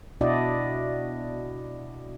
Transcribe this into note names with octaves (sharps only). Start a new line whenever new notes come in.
B2 D4 E4 F#4 D5 D#5